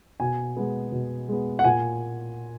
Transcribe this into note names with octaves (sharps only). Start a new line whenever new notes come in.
B2 G#5
G#3 B3
B2
G#3 B3
F#5
A#2 G#5